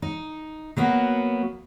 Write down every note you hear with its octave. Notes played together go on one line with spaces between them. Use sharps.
D#4
F#3 A#3 B3 F#4